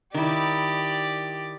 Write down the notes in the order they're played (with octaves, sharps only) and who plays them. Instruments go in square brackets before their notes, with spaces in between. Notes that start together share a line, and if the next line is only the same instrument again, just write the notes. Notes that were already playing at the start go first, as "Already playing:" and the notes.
[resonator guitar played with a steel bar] D#3 E4 [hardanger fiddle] G4 D5